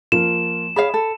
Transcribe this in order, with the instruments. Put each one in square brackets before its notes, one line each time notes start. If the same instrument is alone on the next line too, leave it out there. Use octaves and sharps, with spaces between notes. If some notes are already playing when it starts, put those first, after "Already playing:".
[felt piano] F3 A#3 F4 [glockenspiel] E7
[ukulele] G#4 C#5 F5 [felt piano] B5
[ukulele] A4